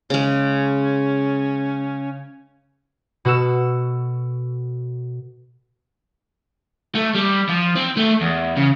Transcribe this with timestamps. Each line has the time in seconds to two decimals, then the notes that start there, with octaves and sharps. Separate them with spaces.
0.10 C#3 G#3 C#4
3.25 B2 F#4 A4 E6 E7
6.95 A3
7.15 G3
7.49 F3
7.76 C4
7.97 A3
8.21 E2
8.57 C#3